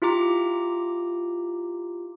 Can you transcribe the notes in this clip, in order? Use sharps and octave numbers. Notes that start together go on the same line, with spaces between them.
E4 F4 G4 A#5 D6